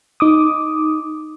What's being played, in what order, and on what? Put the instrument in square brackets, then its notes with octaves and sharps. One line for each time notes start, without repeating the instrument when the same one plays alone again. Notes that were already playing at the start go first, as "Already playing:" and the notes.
[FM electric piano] D#4 D6 D#6